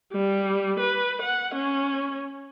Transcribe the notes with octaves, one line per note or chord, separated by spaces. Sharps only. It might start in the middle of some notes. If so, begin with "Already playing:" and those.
G3
B4
F#5
C#4